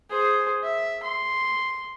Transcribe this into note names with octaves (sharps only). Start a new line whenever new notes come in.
G#4 C5
E5
C6